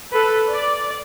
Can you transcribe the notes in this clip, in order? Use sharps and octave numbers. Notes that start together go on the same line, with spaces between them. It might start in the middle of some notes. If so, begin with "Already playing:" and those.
A4 B4
D5